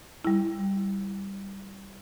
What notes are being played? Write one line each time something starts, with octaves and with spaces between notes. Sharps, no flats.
G3 E4